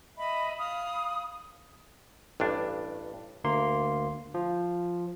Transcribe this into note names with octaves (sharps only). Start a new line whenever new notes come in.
D#5 E5 B5
F5 B5 D#6
A1 G2 D4
D2 A#3 C6
F3